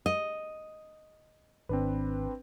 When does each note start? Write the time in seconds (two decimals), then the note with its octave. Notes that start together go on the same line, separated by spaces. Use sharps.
0.06 D#5
1.69 G#1 C4 D4 B4